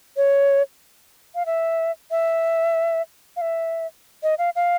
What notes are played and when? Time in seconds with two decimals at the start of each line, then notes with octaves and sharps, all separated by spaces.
0.17 C#5
1.35 F5
1.46 E5
2.11 E5
3.36 F5
3.41 E5
4.23 D#5
4.38 F5
4.56 F5